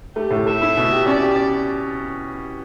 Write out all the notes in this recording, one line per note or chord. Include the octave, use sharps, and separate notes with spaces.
A3 G4
A2
A3 E5
E4
B2
G4
C#4 D5
G4